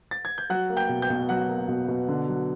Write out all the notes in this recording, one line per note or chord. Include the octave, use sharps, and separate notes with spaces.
A6
G#6
G6
F#3 F#5 F#6
A#3
G5 G6
B2
G5 G6
B2
F#3 F#5 F#6
A#3
B2
B2
D3
F#3